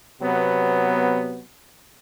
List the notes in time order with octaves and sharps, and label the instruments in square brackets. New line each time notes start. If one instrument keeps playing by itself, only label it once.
[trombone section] C3 F#3 B3